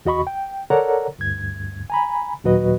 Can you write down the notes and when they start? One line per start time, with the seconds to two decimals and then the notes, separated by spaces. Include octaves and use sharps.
0.05 E2 F#4 D#5 B5 C#6
0.27 G5
0.70 A4 A#4 C#5 D5 F#5 A#5
1.19 D2 G2 G#6
1.90 G#5 A#5 B5
2.44 D#2 A#2 F#3 F#4 B4 D#5